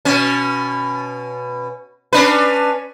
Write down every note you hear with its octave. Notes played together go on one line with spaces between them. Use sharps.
B2 C#4
C#4 D4 B4